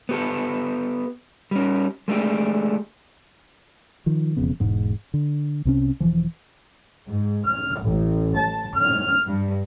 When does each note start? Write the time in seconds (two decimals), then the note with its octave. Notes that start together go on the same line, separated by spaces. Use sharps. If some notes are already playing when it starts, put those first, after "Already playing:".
0.09 B3 G4 A4
1.51 G3 C#4
2.08 G#3 A3 D4 G4
4.06 D#3 F3
4.37 E1 F2 C#3 B3
4.60 E1 G#2 G#3
5.14 D3
5.65 C2 C3 C#4
6.00 E1 E3 F3
7.08 G#2
7.45 F6
7.82 A1
8.36 A5
8.76 F6
9.26 G2